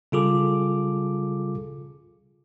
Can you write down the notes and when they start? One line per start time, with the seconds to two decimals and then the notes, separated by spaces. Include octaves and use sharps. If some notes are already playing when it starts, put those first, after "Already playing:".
0.12 C#3 G3 F4 G#4 A4 D6